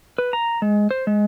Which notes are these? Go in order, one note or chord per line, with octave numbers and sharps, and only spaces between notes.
B4
A#5
G#3
C5
G#3